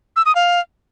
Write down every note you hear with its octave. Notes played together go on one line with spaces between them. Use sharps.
E6
D#6
F5